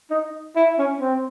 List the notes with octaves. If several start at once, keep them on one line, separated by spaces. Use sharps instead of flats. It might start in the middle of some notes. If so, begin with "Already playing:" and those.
D#4
E4
C#4
C4